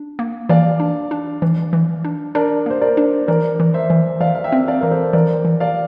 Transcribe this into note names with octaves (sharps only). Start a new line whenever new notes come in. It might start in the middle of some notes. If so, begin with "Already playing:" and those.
Already playing: D4
A#3
E3 D5 F5
D4
D4
E3
E3
D4
D4 A#4 D5
A#3 C5
A#4 D5
D4
E3 A#4 D5
E3
C5 E5
E3
E3 D5 F5
F5
E5 G5
C4
E5
D5 F5
E3 A#4
A4 C5
E3 A#4 D5
E3
D5 F5